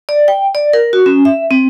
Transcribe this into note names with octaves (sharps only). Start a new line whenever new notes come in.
D5
G5
D5
A#4
F#4
C#4
E5
C4